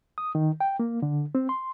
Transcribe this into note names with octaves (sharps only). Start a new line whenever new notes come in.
D#6
D#3
G5
A#3
D3
C4
C6